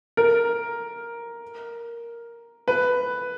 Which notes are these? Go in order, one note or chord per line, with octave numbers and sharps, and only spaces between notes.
A#4
B4